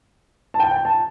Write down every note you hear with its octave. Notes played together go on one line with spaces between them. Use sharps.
A5
G5
G5
A5